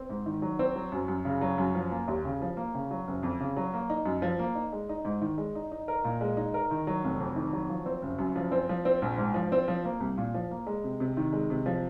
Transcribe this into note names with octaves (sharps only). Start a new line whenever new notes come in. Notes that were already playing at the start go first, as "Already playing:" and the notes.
Already playing: C4
G#2
D#3
F#3
C4
F#3
F#2
F#2
C#3
F#3
F#2
F3
A#3
D#2
C#3
F3
A#3
C#3
F#3
F#1
F2
C#3
F#3
A#3
D#4
F#2
F3
A#3
D#4
G#3
D#4
G#2
D#3
G#3
D#4
D#4
A#4
A#2
G#3
D#4
A#4
D#3
F#3
F1
F2
D#3
F#3
F3
C4
F#1
F#2
F3
C4
F3
C4
A#1
G#2
F3
C4
F3
A#3
C2
A#2
F3
A#3
G#3
C3
C3
D#3
G#3
C3
F3